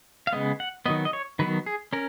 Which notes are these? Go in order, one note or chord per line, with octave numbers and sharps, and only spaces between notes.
F5
C#3 G#3 B3 D#5
F#5
D#3 F#3 B3 D#5
D#5
C#5
D#3 F#3 B3 B4
G#4
C#4 A#4